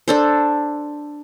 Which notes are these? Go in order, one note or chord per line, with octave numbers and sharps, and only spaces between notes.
D4 A4 C5